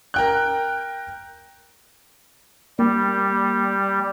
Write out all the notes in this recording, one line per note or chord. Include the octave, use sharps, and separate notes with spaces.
A#4 G5 F#6
G3 A#3